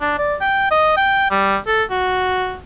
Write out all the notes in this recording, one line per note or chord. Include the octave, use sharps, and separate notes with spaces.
D4
D5
G5
D#5
G5
G3
A4
F#4